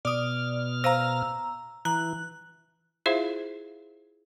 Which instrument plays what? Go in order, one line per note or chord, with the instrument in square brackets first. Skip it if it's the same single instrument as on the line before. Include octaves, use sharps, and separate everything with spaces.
[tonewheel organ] B2 F6 [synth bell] D5 D#6
[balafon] C5 F5 [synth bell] A#5 E6
[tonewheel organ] E3 [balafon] A#5 [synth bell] F#6
[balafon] E4 F4 G#4 C5 E5 F5